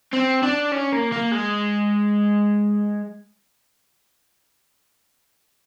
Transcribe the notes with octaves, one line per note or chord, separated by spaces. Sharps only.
C4
D4
C#4
A#3
A#3
G#3